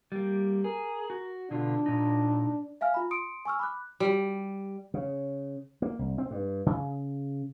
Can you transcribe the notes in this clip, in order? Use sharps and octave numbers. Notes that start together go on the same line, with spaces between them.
G3 A#3
G#4 A#4
F#4
B2 D3 D4 F4
A#2 D#4
E5 F5 G#5 F6
F4 B5
C6 D#6 C#7 D7
G#5 C#6 E6 F6
B5 D6 F#6
G3
C#3
A#3
C2
C4
G2
C#3